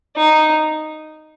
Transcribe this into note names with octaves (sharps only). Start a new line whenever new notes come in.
D#4